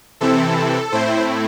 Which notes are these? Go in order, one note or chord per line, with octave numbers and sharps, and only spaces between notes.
C3 E3 C4 E4 A4
A2 A3 C4 E4 C5